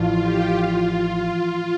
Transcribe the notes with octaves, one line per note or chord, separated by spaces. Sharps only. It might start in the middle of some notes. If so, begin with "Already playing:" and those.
Already playing: A1 A2 F3 F4
G4
F4